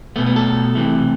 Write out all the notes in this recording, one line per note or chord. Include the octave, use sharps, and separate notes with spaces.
B2 A3 B3
B3
A4
C3 E3 A3